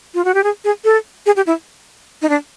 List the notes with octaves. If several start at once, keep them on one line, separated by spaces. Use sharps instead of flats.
F4
F#4
G4
G#4
G#4
A4
G#4
G4
E4
D#4
D4